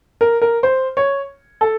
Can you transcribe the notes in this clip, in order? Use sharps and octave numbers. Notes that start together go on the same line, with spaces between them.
A#4
A#4
C5
C#5
A4